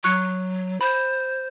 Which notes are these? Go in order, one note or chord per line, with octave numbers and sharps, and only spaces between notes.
F#3 C#6 F#6 C#7
C5 B5